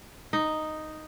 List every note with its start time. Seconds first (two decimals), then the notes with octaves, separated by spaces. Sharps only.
0.33 D#4